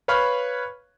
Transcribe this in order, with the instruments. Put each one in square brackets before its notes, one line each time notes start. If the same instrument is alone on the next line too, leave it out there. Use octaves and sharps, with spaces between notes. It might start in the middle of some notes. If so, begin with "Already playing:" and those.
[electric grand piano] B4 C#5 F5 B5 C#6 F6